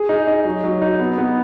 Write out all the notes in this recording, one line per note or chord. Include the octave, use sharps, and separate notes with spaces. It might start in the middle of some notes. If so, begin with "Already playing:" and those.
Already playing: G#4
D#4
D#4
F#3
F#3
D#4
B3
B3